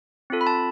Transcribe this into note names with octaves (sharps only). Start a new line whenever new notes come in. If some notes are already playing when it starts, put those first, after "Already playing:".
C4 F4 A4
B5
A5